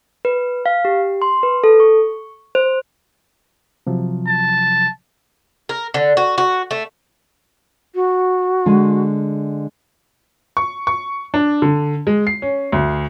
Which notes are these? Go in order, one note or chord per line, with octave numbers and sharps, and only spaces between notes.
B4
F5
G4
C6
B4
A4
C#6
C5
C3 F3 F#3
A5
A#4
D3
F#4
F#4
A3
F#4
D3 G#3 G#5
C#6
C#6
D4
D3
G#3
C7
C#4
D2